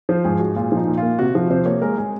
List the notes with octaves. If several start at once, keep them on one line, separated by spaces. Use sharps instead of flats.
F3 C5
G#2 G#4
G#3 F#4
A#2 F4
F3 D#4
A#2
F4
A#3
C3 F#4
F3
C3 C5
A#3 C#5
G#3 A#4
G#3 G#4